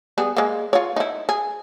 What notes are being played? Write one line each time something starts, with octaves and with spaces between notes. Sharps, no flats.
G3 B3 G#4
G#3 A#3
F4 C#5
D#4 E4
G#4